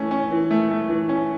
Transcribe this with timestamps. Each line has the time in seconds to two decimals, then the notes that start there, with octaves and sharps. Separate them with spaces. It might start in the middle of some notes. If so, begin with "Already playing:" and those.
Already playing: E3 A3 C#4
0.11 C#4
0.31 E3
0.51 A3
0.71 A3
0.89 E3
1.09 C#4